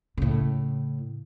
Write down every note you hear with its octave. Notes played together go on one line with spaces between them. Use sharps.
A2 C#3